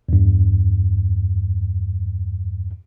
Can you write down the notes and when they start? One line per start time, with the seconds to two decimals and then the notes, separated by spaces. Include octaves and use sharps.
0.09 E2 G2